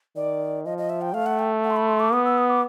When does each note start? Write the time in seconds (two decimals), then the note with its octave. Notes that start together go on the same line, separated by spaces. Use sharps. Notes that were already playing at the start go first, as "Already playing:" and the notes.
0.16 D#3 D5
0.65 F3 D#5
0.78 D#5
0.90 E5
1.01 G5
1.14 A3 F5
1.26 F#5
1.39 G5
1.64 F#5
1.70 C6
1.76 B5
1.88 C6
2.00 D6
2.13 B3 D#6
2.25 E6
2.38 D#6
2.50 D6